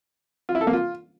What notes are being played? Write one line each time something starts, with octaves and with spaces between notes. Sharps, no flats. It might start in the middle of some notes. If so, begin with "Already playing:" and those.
F4
E4
A4
A#3
F4